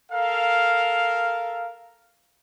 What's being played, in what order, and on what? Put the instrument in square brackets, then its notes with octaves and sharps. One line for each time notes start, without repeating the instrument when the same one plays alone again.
[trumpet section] A4 A#4 F5